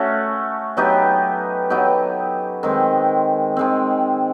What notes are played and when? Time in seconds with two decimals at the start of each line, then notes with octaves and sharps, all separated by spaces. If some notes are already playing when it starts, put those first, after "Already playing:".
Already playing: A3 C#4 F#4
0.77 F#3 B3 D#4 G4
1.70 F#3 B3 D#4 G4
2.63 D#3 G#3 C4
3.57 D#3 G#3 C4